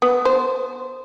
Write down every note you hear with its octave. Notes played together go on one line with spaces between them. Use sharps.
B3
C5